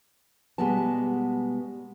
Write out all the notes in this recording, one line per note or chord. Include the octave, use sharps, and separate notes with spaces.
B2 G3 G#3 B3 A5